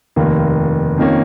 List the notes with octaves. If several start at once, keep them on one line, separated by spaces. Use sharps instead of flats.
F1 D#2 D#3 A#3
F2 D#3 A#3 C#4